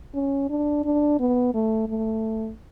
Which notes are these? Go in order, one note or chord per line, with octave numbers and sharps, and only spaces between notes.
C#4
D4
D4
B3
A3
A3